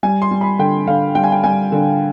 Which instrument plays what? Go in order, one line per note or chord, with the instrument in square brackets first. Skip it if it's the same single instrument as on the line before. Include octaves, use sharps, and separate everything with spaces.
[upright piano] G3 G#5
C6
G3
B5
D3 G5
D3 F5
G3 G5
G#5
G5
G3 G#5
D3